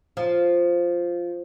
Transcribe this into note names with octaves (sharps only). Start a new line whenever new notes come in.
F3